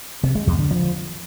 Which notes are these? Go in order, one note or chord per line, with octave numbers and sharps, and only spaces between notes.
C3
G#3
E2
D3
F3